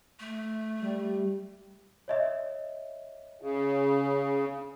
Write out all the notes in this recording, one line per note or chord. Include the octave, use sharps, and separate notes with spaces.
A3
G3
C#5 D#5 E5
C#3